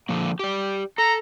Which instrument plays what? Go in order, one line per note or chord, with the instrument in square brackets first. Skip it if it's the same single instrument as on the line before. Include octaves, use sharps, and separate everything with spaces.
[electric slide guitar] D3 F3 A#3
G4 D5
[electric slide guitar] A4 [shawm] A#5